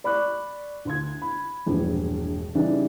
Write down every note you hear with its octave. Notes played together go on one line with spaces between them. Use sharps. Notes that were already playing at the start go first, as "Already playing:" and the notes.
D5 B5 C#6 D6 F#6
D2 C6 G#6
B5
E1 A#1 G2
C#3 E3 G3 D4 D#4